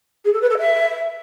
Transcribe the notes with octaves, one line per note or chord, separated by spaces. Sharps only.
G#4
A4
B4
A4
E5